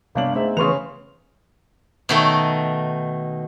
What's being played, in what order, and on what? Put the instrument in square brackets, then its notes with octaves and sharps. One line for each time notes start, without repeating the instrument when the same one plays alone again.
[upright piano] G1 D4 F#7 [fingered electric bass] C3 G3 C4 [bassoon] A#3
[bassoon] G#2 [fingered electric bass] A3 B3 [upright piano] C4 E5
[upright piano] C#3 C6 F7 [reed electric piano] E3 B4 C#6
[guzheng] B2 D#3 A3